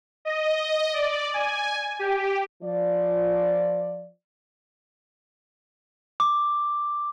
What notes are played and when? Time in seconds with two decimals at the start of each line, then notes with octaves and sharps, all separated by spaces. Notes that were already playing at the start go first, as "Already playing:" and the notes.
0.25 D#5
0.93 D5
1.34 G#5
1.99 G4
2.63 F3 D5
6.20 D6